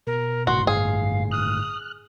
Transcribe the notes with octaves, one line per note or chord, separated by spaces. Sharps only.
B2 A#4
G1 A2 F#4 C6
G2 G#4 F5
D#6 F6 F#6